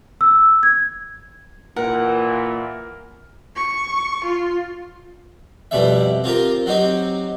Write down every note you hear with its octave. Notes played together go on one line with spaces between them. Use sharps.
E6
G#6
A#2 E3 A#4 F#5
C#6
F4
F2 B2 G3 E5
C4 F4 G4 A#4
F#3 C4 D#4 G4